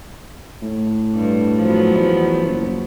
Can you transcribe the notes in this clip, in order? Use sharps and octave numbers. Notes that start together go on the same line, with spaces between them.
A2
G2
F3 F#3 B3
E2
F#1